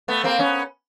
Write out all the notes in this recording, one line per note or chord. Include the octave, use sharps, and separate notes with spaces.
A3 B3
A#3 C4
B3 C#4